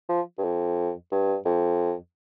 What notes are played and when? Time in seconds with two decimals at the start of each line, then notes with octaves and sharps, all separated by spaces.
0.09 F3
0.38 G2
0.43 F2
1.11 G2
1.45 F2